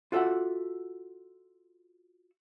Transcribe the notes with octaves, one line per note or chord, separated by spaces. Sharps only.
F4 F#4 A4 C#5 E5 F#5